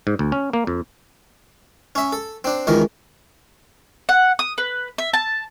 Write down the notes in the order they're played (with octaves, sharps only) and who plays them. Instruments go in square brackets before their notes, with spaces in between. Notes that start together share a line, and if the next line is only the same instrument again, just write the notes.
[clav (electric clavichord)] G#2
D2
C#4
A#3
F2
[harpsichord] C#4 E5
A4
C4 D4
C#2 D#3 E3 A#4
[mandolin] F#5
D#6
B4
E5
A5